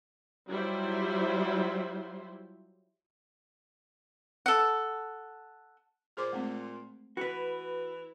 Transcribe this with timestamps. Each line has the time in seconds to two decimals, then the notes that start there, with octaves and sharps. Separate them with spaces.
0.50 F#3 G3 E4 F4 C5
4.46 A4 F#5
6.17 A#2 G#4 C5 D6
6.33 G#3 A3 C4
7.17 E3 F#4 B4